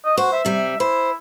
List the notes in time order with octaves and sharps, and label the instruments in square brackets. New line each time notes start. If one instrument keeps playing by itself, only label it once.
[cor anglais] D#5
[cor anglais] F#4 [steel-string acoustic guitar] C5
[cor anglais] E5
[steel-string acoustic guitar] C3 G3
[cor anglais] E4 [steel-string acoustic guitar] C5